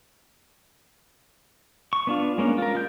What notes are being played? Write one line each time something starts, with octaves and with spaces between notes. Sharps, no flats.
C#6
B3 D4 F4
G#3 A#3 C#4 D4
F4 A#4
G#3 G6